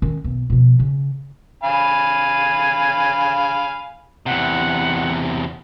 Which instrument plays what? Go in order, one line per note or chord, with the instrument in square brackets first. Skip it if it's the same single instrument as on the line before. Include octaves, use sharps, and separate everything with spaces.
[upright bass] D#3 C#4
B1
B2 F3
C#3
[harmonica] F5 G#5 B5
[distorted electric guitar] E2 C3 [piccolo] F#5